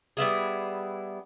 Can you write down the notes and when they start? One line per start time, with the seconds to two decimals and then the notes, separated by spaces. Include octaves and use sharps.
0.17 G3 B3 E4 G#4